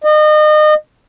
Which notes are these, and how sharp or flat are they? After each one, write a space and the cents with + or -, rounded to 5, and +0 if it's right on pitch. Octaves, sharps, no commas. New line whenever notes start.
D#5 -35